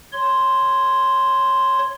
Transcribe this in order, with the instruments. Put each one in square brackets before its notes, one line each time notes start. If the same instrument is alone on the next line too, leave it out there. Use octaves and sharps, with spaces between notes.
[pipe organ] C#5 C6